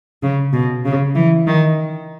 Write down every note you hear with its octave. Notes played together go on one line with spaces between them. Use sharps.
C#3
B2
C#3
E3
D#3